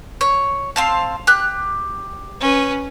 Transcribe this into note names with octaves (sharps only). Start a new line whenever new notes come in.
C#5
C4 F5 A5
G4 F#6
C#4 B4